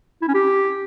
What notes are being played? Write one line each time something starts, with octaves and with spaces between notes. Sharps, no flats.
E4
C#4
G4